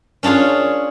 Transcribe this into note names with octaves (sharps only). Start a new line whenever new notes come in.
C#4 D4 F4 G#4 C#5